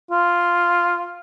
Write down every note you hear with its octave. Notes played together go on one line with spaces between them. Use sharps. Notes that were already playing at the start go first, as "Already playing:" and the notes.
F4